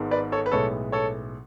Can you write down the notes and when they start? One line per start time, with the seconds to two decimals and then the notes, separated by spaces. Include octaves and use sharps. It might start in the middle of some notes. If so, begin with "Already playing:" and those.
Already playing: G#1 G#2 G#3 B3
0.11 B4 D5
0.32 A4 C#5
0.46 B4
0.52 B1 A2 G#3 B3 A4 C#5
0.92 A4 C#5